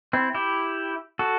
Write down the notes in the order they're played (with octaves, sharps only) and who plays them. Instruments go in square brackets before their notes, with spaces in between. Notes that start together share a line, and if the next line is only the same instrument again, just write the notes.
[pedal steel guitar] C4 E4
E4 G4
F#4 A4